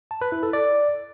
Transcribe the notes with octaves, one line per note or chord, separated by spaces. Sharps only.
A5
B4
E4
A4
D5